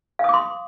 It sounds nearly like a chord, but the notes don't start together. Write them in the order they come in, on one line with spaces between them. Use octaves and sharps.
F5 D#6 D6 C6